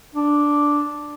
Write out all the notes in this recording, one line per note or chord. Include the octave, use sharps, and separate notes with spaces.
D4